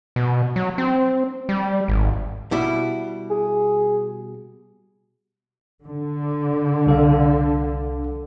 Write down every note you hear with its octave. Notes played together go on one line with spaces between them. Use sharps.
B2
F#3
C4
G3
G#1
B2 G3 E4
G#4
D3
C2 A4 F5